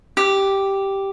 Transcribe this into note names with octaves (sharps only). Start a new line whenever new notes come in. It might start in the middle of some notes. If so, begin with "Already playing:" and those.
G4